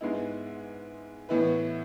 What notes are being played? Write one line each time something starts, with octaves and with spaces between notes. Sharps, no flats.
G#2 G#3 B3 E4
A2 E3 B3 E4 B4